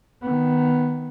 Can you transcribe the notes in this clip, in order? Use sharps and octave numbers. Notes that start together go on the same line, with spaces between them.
D#3 B3